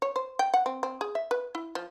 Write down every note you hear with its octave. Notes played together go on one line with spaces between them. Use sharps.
C#5
C5
G5
F#5
C4
C4
G#4
E5
B4
E4
F3